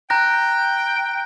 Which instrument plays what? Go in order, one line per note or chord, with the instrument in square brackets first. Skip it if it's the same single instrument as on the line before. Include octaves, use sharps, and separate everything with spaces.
[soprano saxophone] G5 [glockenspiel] A#5 F#6 A#6